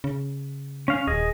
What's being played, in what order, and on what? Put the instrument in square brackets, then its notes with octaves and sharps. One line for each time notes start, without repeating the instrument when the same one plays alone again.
[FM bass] C#3
[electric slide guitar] C#4 F5
[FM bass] D#1 [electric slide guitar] G#4 D#5